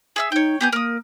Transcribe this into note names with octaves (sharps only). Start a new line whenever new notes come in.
G#4 E5 E6
D#4 C#5 G5
B3 G4 G#4 G6
A#3 A#4 D#6